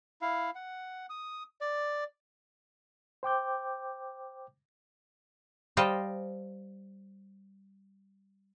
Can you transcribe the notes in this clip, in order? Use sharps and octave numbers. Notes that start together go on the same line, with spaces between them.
E4 F5
F#5
D#6
D5
C5 G5 D6 G6
G3 C5 D#5 F5 G5 A5